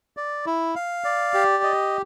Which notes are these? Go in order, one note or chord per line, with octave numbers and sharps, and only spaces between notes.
D5
E4
F5
D5
G4
D#5